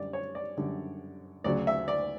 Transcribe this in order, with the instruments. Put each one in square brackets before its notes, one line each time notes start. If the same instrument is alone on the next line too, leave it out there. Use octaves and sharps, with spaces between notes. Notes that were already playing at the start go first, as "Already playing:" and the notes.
Already playing: [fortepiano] F#2 D3 G3 D5
C#5
D5
F#2 D3 G3
D2 C#3 F#3 D5
E5
D5